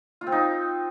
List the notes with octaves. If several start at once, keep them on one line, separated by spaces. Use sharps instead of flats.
F4
C4
D#4